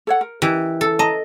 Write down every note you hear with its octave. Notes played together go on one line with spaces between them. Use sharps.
A4 C#5 F#5
A#4
E3 G4 A#4 D#5
A4
D#5 A5 A#5